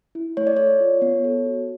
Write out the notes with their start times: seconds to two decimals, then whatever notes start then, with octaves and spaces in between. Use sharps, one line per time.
0.15 E4
0.37 A3 C#5
0.47 D5
0.57 A4 C#5
0.80 F4
1.02 B3
1.24 A4
1.46 F#4